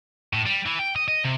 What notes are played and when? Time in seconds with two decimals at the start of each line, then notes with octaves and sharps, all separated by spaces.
0.33 A2
0.46 G3
0.66 E3
0.79 G5
0.96 D#5
1.08 D#5
1.24 C3